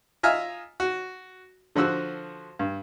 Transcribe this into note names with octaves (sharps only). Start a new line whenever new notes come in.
F4 D#5 E5 G#5 A#5 F6
F#4
D3 F3 F#4 E6 F#6
G2